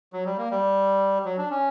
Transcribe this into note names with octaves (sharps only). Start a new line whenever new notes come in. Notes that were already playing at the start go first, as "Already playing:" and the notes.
F#3
G3
A#3
G3
F#3
D4
C#4